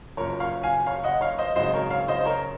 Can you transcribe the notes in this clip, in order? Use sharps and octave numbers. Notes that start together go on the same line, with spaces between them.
F#1 F#2 F3 A#4 C#5
C#5 F5
F5 G#5
C#5 F5
D#5 F#5
C#5 F5
C5 D#5
G#1 F#2 C#3 F#3 C5 D#5
A#4 C#5
C#5 F5
C5 D#5
C5
A#4 C#5